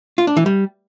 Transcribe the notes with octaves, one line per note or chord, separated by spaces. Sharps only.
F4
D4
E3
G3